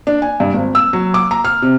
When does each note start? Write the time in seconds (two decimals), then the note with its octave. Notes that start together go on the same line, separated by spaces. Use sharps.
0.07 D4
0.22 G#5
0.40 G2
0.54 G#1
0.75 E6
0.93 F#3
1.14 D6
1.31 A#5
1.44 F6
1.62 C3